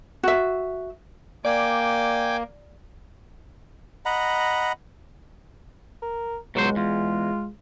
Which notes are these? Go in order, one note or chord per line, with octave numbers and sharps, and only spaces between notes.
F#4 E5
A#3 D5 G5 G#5 D6
D#5 F#5 A#5 B5
A#4
C#2 B2 F#3 G#3 C5
E2 F4